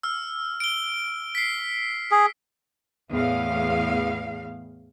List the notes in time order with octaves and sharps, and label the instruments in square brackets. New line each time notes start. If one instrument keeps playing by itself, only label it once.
[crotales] E6 F6
D7 G7
B6 C7
[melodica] G#4
[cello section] E2 A2 F5